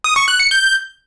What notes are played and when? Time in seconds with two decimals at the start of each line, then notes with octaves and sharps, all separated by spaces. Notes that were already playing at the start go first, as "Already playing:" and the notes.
0.04 D#6
0.16 C#6
0.28 F#6
0.39 C#7
0.51 G6